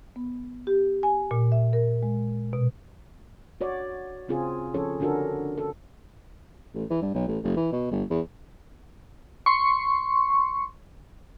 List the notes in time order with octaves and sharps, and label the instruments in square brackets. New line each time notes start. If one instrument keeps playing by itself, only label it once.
[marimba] B3
G4
G#5
A#2
E5
A#4
G#3
B2
[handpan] F#4 C#5 D5
C#3 C4 F4 G#4
F3 C#4 G#4 A4 C#5
D3 D4 F#4 A4 A#4
A4
[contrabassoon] A1
E3
G2
B1
A1
F#1
E3
B2
G1
E2
[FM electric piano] C6 C#6